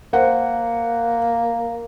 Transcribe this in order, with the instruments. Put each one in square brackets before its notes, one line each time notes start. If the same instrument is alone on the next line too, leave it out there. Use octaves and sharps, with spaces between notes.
[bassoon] A#3 [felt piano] C5 F#5